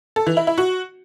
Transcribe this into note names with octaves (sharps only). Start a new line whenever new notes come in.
A4
E3
E4
E4
F#4